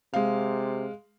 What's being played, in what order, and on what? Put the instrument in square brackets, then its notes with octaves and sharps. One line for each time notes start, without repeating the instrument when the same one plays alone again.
[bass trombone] C3 [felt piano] G#3 F5